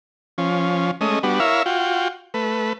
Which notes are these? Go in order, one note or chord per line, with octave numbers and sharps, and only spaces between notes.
F3 C#4
G#3 A3 C#4 D#5
G3 B3 D4 F#4
E4 A#4 C#5 E5 F5
F4 F#4 G5
A3 B4